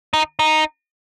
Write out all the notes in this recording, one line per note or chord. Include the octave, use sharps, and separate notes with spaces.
D#4
D#4